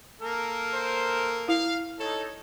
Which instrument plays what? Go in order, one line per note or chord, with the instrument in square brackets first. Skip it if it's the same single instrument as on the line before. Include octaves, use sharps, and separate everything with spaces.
[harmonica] A#3 A4 A#4
[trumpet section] C5
[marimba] E4 [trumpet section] F5
[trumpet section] D#4 A4 [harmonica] C#5